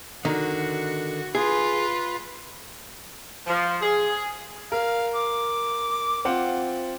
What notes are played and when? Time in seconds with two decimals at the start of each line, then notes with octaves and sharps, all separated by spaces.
0.25 D3 D#3 F#4
1.35 F4 G#4 B4
3.47 F3
3.82 G#4
4.72 A#4 F5
5.15 D6
6.25 C4 F4 F#5